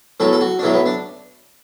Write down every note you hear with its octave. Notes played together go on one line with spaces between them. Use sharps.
B1 A2 F#3 A3 A4
A4
F#4
D4
B1 A2 F#3 A3 E4
B3
D4